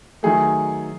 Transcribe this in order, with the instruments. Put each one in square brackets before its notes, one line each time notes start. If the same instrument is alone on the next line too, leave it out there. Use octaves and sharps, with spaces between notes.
[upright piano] D#3 F#3 A3 [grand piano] G#4